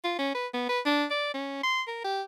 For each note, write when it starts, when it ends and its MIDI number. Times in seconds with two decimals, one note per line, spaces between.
0.04 0.15 65
0.18 0.31 61
0.35 0.47 71
0.54 0.67 59
0.69 0.80 71
0.85 1.05 62
1.10 1.30 74
1.34 1.63 61
1.63 1.82 84
1.88 2.03 70
2.04 2.22 67